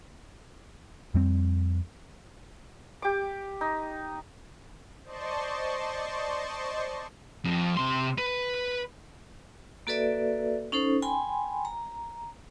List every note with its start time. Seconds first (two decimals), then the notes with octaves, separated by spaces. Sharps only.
1.14 F2 G3 C4
3.02 G4 D6
3.61 D#4
5.04 C5 D5 D#5 A5 C6 C#6
7.44 F2
7.77 C3 C6
8.18 B4
9.87 A#3 F#4 A4 B4 D5 E5
10.72 C#4 D#4 A4 C5
11.02 G5 G#5 B5 C6
11.65 A#5